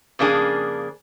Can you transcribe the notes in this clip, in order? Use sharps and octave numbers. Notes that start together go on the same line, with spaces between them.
F2 C#3 A#3 D4 G#4